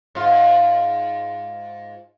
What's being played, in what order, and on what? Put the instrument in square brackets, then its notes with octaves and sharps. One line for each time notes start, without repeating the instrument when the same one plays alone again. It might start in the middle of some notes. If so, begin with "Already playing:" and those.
[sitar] G#2 F4